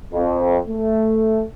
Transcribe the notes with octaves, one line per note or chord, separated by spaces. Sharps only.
F2
A3